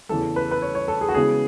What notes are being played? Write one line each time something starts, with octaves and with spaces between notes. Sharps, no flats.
E2 C#3 E3 A3 A4
B4
B4
C#5
C#5
A4
G#4
F#4
C#3 E3 G#3 B3 G#4